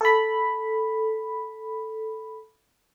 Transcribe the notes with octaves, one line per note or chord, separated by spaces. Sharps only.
A4 B5